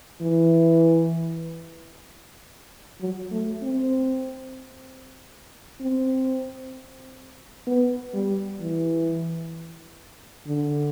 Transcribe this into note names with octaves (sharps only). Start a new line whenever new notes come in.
E3
F#3
A3
C4
C4
B3
G3
E3
D3